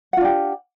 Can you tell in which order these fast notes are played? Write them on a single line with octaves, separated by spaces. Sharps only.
F#5 F4 D4 G4